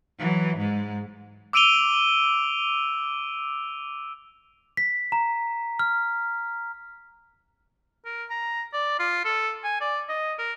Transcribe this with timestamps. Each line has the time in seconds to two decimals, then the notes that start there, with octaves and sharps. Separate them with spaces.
0.18 E3 F#3
0.57 G#2 G#3
1.53 D6 E6 D7 D#7 F7 G7
4.77 B6
5.12 A#5
5.79 F6
8.05 A#4
8.30 A#5
8.73 D5
8.99 F4
9.25 A4
9.64 G#5
9.81 D5
10.09 D#5
10.39 A#4